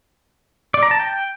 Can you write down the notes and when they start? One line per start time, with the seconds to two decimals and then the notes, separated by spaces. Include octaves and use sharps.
0.74 D5
0.83 A#5
0.91 A5
1.00 G5